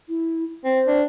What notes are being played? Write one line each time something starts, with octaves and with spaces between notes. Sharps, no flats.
E4
C4 C5
D4